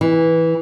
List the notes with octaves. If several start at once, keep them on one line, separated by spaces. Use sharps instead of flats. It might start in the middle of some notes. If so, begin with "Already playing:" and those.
E3